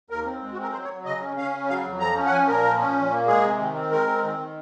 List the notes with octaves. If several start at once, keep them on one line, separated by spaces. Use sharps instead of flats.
D#2 A#4
C4
G#3
F#4
C4
A#4
F#3 C5
C#5
F#3
C#3 D#5
C#4
C#4 F5
C#3
F#3 F5
F2
F3 A#5
C#4
F#5
F3 G#5
A#2 A#4
F3
C#4
A#2
A#3
G#3 G#4
C3
D#3
C4
G#3 A#4
C4
D#3
D#3